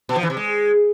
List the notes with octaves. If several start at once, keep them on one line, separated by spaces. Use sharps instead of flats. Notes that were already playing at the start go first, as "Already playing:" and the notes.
B2
F3
E3
C3
G#3